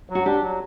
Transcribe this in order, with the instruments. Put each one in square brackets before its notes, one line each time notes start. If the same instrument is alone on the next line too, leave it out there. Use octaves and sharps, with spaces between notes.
[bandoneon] F#3
[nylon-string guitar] F#4
[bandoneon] D4 [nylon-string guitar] G4
[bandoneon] F#3